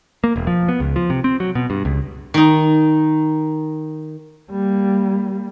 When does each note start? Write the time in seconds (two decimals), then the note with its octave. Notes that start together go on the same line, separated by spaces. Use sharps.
0.24 A#3
0.36 E1
0.47 F3
0.68 B3
0.80 C#2
0.96 F3
1.10 C3
1.24 C4
1.40 F#3
1.55 B2
1.70 G2
1.85 C#2
2.34 D#3 D#4
4.51 G3 A#3